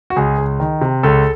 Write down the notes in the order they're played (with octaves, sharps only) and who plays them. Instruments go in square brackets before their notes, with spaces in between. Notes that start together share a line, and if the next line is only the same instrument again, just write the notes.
[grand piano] F#4
C#2 G#4
C#2
D#3
C3
C#2 A4